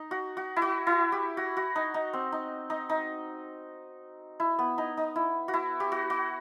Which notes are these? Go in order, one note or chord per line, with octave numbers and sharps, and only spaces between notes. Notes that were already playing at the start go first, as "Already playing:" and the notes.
Already playing: D#4
F#4
F#4
E4
F#4
E4
G4
F#4
F#4
D#4
D#4
C4
D#4
D#4
D#4
E4
B3
D#4
D#4
E4
F#4
E4
G4
F#4
F#4